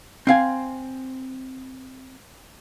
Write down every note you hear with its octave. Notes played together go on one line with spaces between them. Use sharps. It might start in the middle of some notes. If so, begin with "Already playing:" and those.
C4 F5 G#5